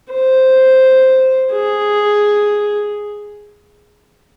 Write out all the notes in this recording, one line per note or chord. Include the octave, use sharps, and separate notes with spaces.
C5
G#4